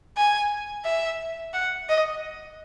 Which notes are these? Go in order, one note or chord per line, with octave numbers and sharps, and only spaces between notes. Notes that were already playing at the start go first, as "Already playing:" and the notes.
G#5
E5
F#5
D#5